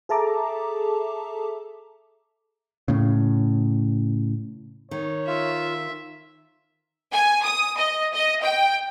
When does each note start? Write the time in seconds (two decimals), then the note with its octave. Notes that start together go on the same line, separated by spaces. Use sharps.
0.09 G#4 A4 E5 A5 A#5 D6
2.88 A2 C#3
4.91 D#3 C#5
5.27 F4 E5
7.11 G#5
7.43 D#6
7.77 D#5
8.13 D#5
8.43 G5